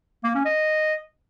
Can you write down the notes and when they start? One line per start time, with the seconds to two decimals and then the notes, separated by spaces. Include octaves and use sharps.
0.24 A#3
0.35 C#4
0.45 D#5